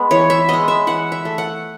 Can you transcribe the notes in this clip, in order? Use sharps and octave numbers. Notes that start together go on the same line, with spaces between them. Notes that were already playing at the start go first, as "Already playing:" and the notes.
Already playing: G#3 B3
E3 C#5
E5
G#3 B3 D#5
E5
E3 F#5
E5
A3
F#5